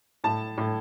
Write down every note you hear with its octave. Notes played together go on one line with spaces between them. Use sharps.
A2 A5
A2